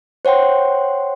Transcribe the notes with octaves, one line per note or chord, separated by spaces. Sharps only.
C5 C#5 F#5 G5 C6